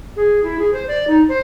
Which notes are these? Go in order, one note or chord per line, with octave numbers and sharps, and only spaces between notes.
G#4
E4
G#4
C5
D5
D#4
C5